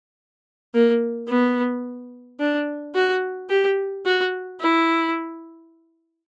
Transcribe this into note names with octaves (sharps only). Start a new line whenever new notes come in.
A#3
B3
D4
F#4
G4
F#4
E4